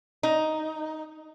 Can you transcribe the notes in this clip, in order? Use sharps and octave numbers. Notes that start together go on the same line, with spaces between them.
D#4